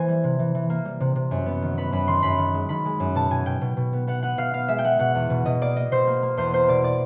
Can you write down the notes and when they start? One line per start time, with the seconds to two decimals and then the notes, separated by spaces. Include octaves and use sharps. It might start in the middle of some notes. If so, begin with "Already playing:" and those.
Already playing: E3 A#3 C5 G#5
0.08 G3
0.24 C3
0.39 E3
0.55 E3
0.70 A#3
0.85 G3
1.00 C3
1.16 C3
1.31 F#2
1.46 B3
1.62 D#3
1.78 B3 B5
1.92 F#2 B5
2.08 D#3 C6
2.23 F#2 B5
2.38 D#3
2.54 G#3
2.69 D#3 B5
2.85 G#3
3.00 F#2
3.15 B2 A5
3.30 B2 G#5
3.46 B2 G5
3.61 B2
3.77 B2
3.93 B3
4.07 B3 F#5
4.23 B3 F#5
4.37 B2 F5
4.53 B3 F5
4.68 G#3 E5
4.78 G5
4.84 G#3 F#5
4.99 B2 F#5
5.15 E2
5.30 B2
5.45 B2 D#5
5.61 A#3 D5
5.76 A#3 D#5
5.92 B2 C5
6.07 A#3
6.23 A#3
6.37 E2 C5
6.53 A#3 C5
6.68 B2 D5
6.84 D5